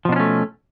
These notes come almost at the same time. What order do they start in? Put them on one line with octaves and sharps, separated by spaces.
F3 B2 D4 C#4 A3